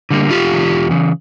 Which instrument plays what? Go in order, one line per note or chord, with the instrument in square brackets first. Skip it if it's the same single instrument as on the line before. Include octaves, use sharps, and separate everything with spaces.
[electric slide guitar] D3 G3 A#3
E2 F4 G4
C#3 E3
E2
C#3 E3